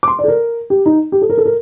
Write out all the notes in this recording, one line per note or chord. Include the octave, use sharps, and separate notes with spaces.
D6
C6
D5
A4
A#4
G4
D#4
G4
A4
A#4
A4
A#4